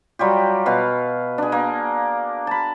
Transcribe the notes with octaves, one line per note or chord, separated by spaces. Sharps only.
F#3 G3 F4 G4
B2 F#4 B4 F5
D4 G#4
A#3
A5 B5